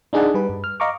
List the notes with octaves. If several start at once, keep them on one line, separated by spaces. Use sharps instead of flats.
D4 D#4 G#4 D5 F#5 A5
G3 B4
G2
F6
D#5 F5 A#5 C#6 D6